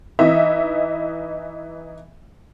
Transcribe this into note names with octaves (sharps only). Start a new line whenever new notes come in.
E3 D#4 D#5 E5